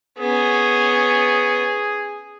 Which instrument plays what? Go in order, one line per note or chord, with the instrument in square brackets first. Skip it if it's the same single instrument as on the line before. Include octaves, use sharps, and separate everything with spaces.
[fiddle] B3 C#4 [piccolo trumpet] G#4